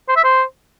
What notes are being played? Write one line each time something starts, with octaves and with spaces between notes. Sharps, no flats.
C5
E5
C5